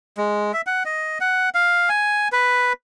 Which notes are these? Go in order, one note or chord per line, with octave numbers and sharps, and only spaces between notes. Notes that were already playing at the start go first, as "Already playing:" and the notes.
G#3
E5
F#5
D#5
F#5
F5
G#5
B4